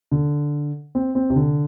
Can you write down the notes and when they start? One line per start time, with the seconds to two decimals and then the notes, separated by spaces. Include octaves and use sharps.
0.11 D3
0.95 C4
1.15 C4
1.30 C3
1.36 D3